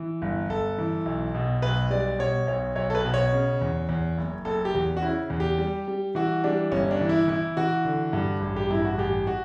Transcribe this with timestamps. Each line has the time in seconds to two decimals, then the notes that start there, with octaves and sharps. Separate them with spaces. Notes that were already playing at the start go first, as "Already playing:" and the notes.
Already playing: E3
0.22 G1
0.49 G1 A4
0.78 E3
1.06 B1
1.34 B2
1.62 B1 B4
1.90 G3 D5
2.19 B2 C#5
2.47 B1 C#5
2.75 B1 C#5
2.90 A4
2.95 B4
3.05 B2
3.14 C#5
3.33 C#3
3.61 E2
3.89 E2
4.18 F#1
4.45 F#1 A4
4.65 G4
4.75 E2
4.97 F#4
5.02 C#3 E4
5.30 E2
5.40 G4
5.58 G3
5.88 G3
6.15 E3 F#4
6.44 G3 D4
6.71 G1 C#4
6.91 D4
7.01 E3
7.09 E4
7.28 E3 E4
7.57 E3 F#4
7.85 D3
8.13 G2
8.41 A1
8.56 G4
8.70 G2 E4
8.85 F#4
8.98 A1 G4
9.27 F#4